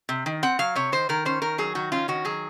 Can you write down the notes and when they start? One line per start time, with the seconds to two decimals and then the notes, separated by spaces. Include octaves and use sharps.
0.09 C3
0.26 D#3
0.43 C4 F#5
0.59 F#3 F5
0.75 C3 C#5
0.92 D#3 C5
1.09 D#3 A#4
1.25 C#4 C5
1.42 D#3 A#4
1.58 F#3 G#4
1.75 D#3 F#4
1.92 C#4 F4
2.08 D#3 F#4
2.25 F#3 G#4